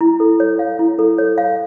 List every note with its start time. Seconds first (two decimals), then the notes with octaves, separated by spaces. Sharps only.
0.01 E4
0.20 A4
0.40 C#5
0.59 F5
0.79 E4
0.99 A4
1.18 C#5
1.38 F5